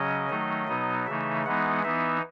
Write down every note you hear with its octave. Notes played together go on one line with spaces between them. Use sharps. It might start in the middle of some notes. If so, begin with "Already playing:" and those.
Already playing: C#3 F#3 C#4 D#5
D#3 F#3 A3 D#4
B2 F#3 B3 D#4
C#3 E3 A3 D#4 E5
E3 G#3 B3 D#4 F#5
E3 B3 D#4 E5